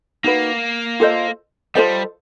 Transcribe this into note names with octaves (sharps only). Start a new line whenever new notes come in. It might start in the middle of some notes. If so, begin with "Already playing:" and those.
A#3 D#4 F#4 B4
F4 A4 C5 D#5
G3 F4 A4 C5 D#5